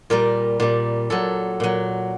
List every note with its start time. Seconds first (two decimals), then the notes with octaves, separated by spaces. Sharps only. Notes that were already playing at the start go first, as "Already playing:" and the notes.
0.10 A#2 G3 A#4
0.60 A#2 G3
1.10 A#2 F#3 A4
1.60 A#2 F#3